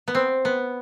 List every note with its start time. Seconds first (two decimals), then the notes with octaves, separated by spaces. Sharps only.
0.08 B3
0.15 C4
0.45 B3